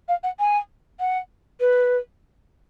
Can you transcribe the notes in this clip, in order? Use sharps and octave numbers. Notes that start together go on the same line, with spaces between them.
F5
F#5
G#5
F#5
B4